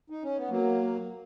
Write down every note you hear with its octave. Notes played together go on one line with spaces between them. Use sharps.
D#4
C#4
B3
F#3 A#3